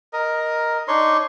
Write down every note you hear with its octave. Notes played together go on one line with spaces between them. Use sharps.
A#4 D#5
D4 D#4 C#5 C6